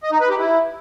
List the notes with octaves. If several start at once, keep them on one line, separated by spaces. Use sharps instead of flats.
D#5
D#4
B4
G4
E4